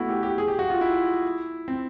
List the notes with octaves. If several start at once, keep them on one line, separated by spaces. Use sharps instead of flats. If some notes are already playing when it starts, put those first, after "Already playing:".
Already playing: A3 B3 E4 F#4
G4
G4
G#4
G4
F#4
F4
E4
C4